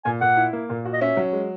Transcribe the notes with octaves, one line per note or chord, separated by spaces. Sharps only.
A#2 G#5
A#2 F#5
E4
A#3
A#2
F#4
D#5
C#4 E5
F#3
G#3